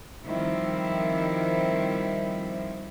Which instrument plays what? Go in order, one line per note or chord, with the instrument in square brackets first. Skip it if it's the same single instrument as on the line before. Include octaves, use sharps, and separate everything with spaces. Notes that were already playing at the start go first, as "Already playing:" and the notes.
[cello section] D#3 F3 G3 C4 E4